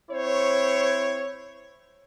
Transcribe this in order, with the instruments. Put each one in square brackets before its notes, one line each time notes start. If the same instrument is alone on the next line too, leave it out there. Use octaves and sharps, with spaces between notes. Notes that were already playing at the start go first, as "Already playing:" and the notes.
[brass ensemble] C4 E4 C5 C#5